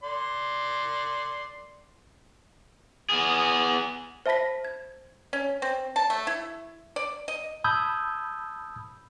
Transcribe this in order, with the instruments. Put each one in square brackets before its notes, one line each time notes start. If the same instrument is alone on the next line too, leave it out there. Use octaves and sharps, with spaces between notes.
[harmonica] D5 C6
[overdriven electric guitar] B3 G#4
[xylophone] C5 E5 A5 B5 A#6 B6
G#6
[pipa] C#4
C4
A5
A3
E4
D5
D#5
[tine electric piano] A5 B5 D#6 E6 G6 G#6